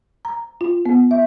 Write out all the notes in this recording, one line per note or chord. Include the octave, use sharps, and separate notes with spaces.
A#5
F4
B3
E5